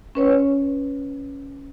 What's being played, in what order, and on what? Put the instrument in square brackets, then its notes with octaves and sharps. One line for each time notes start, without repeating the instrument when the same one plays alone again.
[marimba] C#4 B4 C#5